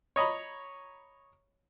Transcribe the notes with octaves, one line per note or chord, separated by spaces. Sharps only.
C#5 D#5 A#5 B5